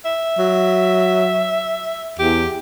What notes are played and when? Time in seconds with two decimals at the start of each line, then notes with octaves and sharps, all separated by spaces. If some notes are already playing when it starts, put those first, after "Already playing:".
0.05 E5
0.39 F#3
2.19 E2 G4